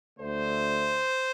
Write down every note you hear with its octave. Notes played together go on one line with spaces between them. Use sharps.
D2 D3 A3 C5